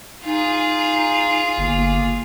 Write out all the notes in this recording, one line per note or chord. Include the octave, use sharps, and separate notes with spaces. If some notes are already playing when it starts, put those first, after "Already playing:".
D#4 F4 G#4
G1 A#3